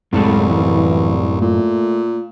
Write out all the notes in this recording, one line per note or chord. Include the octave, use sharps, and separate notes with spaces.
C2 F#2 A2 G#3 A4
E3
A#2 A3